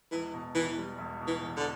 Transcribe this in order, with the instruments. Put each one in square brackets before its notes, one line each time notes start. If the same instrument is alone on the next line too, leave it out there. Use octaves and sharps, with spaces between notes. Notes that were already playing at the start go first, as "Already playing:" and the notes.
[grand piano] E1 [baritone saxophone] E3
[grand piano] B2
[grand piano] E2 [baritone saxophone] E3
[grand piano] G3
E1
B2
[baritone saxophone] E3
[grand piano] E2
[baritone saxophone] D3